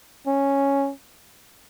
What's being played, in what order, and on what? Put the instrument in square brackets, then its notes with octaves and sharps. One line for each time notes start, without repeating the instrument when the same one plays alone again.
[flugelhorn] C#4